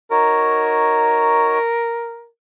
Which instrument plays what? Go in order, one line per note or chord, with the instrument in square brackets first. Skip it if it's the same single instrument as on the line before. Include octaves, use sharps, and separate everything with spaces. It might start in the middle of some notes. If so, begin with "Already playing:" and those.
[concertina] D#4 F#4 C#5 [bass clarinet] A#4